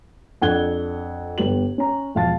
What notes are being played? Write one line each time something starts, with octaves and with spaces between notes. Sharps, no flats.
F2 D4 F#5 F#6 G#6 G7
G1 B3 G4 F#7
C#4 C#5 A#5
E1 F3 F5 A5 A6